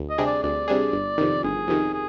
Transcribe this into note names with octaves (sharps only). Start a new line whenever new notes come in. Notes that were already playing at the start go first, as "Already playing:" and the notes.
Already playing: D2
D#5
C3 G3 D4 G#4
D5
D2 D5
C3 G3 D4 G#4
G1
F2 C3 D#3
G1 G#4
F2 C3 D#3
G#4